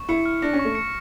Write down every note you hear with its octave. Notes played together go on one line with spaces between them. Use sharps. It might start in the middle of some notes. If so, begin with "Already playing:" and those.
Already playing: C#6
E4 C#7
F6
D4 A#6
C#4
C#6
A3
C#7